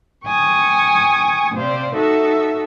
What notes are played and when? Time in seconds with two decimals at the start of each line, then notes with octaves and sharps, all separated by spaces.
0.24 G5 G#5 C#6 D#6
1.54 C3 C5 D5 F5
1.95 D#4 F#4 A4 E5